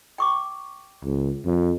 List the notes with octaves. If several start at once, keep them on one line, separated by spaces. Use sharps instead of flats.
G5 C#6 D6
C#2
F2